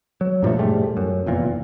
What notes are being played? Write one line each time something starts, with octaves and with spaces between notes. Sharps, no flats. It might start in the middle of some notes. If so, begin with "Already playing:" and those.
F#3
G2 A#2 F3 A3
E1 G#2 G3 A3
F#2
F1 E2 A#2